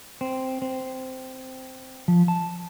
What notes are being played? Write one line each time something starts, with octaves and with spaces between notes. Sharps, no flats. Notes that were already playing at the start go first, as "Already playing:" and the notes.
C4
C4
F3
A5